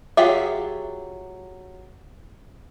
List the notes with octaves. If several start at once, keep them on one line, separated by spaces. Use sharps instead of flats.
F#3 F4 G4 G#4 E5